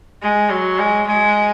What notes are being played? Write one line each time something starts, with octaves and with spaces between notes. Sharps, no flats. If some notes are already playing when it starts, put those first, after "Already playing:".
G#3
F#3
G#3
G#3